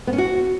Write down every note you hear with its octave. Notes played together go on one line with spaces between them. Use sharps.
B3
C#4
F#4